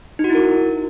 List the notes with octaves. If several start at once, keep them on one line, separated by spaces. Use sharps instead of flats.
D#4
F#4
E4
A#4